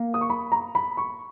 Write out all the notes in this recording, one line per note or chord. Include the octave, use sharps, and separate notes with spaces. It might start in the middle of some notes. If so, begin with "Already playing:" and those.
Already playing: A#3
D#6
C#6
B5
A#5
B5
C#6